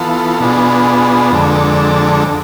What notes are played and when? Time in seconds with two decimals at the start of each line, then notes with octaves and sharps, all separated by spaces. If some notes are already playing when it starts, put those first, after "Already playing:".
Already playing: E3 B3 F4 A4
0.40 B2 B3 D4 F4 G#4
1.31 F2 D3 G#3 D4 A4